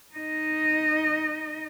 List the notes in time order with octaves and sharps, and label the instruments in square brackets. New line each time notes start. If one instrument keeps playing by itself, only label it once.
[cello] D#4 D#5